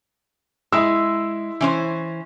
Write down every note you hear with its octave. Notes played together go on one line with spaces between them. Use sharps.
G#3 E4 E6
E3 C#4 C5